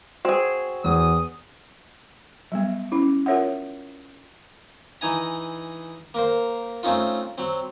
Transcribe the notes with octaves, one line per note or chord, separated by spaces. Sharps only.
C4 F#4 G#4
E2 D#6
F#3 G3 B3
C#4 E4
F4 A#4 C#5 E5 F#5
E3 D#4 G#5 A#5
A#3 A#4 C5
A3 C4 C#4 D#4 F4
F#3 C4